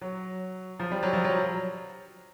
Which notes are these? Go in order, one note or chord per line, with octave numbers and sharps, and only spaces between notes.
F#3
F3
G3
F#3
F3
F#3